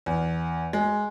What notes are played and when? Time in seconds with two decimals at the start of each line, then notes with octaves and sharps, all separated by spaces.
0.06 E2
0.73 G#3